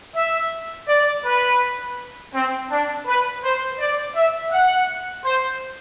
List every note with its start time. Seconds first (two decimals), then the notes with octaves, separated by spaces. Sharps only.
0.15 E5
0.88 D5
1.24 B4
2.35 C4
2.70 D4
3.07 B4
3.44 C5
3.80 D5
4.16 E5
4.52 F#5
5.24 C5